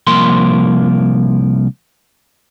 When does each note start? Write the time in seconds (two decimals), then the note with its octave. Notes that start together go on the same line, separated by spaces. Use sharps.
0.07 C2 F3 A#3 C6